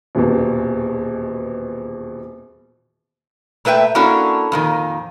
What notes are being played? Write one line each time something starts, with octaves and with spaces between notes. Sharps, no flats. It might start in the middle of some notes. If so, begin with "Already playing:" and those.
D#1 E2 B2
A#2 A3 B4 E5 G5
A#3 C#4 D4 E4 F#4 A4
F2 A#2 D#3